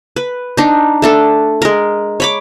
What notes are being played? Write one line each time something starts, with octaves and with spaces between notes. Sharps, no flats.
B4
D4 D#4
A3 D4 A4
G#3 A#4
C#5 B5 D6